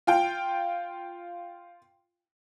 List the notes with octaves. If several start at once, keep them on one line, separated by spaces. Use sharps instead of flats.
F4 G5